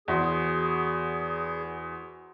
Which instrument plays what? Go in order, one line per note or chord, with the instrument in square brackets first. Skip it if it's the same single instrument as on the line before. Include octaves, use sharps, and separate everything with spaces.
[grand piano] E2 [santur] F#4 C5 [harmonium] G#4